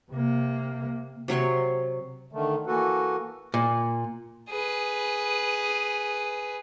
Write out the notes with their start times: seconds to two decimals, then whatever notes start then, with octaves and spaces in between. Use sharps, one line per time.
0.11 C3 A#3
1.28 C3 F#3 C#5 C6
2.33 D3 D#3 A3
2.67 E3 A#3 F#4 A4 B4
3.54 A#2
4.49 G#4 B4